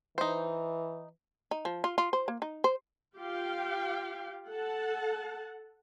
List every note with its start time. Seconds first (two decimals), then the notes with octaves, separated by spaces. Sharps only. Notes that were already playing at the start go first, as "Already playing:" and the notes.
0.18 E3 D#4 C5
1.51 D#4
1.65 F3
1.84 F4
1.98 F4
2.13 C5
2.28 A#3
2.42 D#4
2.64 C5
3.16 F4 G4 F5 G5
4.50 A4 F#5 A5